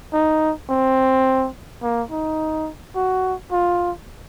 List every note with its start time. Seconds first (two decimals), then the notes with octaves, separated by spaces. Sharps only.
0.13 D#4
0.69 C4
1.82 A#3
2.10 D#4
2.95 F#4
3.52 F4